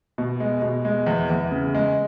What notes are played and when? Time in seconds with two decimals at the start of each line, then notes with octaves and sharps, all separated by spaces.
0.18 B2
0.40 G#3
0.62 B2
0.85 G#3
1.07 E2
1.30 E2
1.51 C#3
1.74 G#3